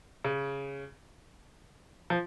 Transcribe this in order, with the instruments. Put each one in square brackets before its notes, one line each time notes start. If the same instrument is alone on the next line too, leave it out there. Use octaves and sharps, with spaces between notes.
[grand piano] C#3
F3